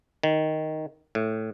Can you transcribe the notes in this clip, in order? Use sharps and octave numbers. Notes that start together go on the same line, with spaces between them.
D#3
A2